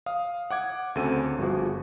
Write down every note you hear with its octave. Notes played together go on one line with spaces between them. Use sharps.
F5 D#6
F#5 D6 G#6
D2 C#3 C4 A4 D#7
G1 F3 F#4 G#4